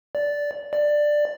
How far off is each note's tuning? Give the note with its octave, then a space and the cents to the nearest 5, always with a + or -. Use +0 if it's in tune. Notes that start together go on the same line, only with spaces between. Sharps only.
D5 -10
D5 +10